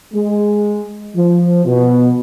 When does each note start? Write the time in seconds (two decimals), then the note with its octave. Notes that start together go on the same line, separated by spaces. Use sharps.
0.13 G#3
1.15 F3
1.65 B2